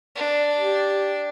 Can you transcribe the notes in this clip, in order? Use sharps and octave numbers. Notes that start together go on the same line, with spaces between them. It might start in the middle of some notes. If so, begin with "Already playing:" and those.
D4
G4